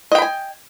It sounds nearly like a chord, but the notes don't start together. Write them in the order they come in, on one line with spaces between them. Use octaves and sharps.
D#5 G5 B5 G#5